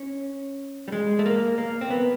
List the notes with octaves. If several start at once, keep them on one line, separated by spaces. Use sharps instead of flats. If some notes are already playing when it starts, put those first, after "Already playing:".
Already playing: C#4
G3
G#3
A3
A#3
A#3
C4
B3